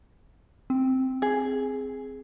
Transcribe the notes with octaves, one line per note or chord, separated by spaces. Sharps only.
C4
G#4